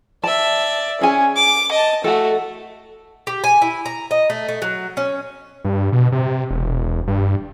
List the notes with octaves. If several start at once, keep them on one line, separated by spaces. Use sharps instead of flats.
D5 E5 A5
C#4 G#4 G#5
D6
D#5 A5
A3 F#4 A4 F#5
G4
G#5
E4
A#5
D#5
A3
A3
F#3
C#4
G2
B2
C3
E1
G2